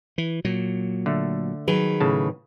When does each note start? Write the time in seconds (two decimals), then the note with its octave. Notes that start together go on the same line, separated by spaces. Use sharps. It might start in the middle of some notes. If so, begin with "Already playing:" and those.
0.18 E3
0.45 A#2 F#3
1.06 D3 A3
1.68 D#3 F#3 G#4 B4
2.00 A2 C#3 A5